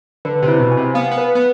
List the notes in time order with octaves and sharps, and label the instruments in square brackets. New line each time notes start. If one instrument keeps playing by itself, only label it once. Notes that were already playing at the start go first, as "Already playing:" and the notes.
[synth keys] D3 [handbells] B4
[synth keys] C3
[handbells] E4
[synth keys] B2
[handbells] G#5
[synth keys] C3
[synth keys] B3 [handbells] F5
[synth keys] B3
[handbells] B4
[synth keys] B3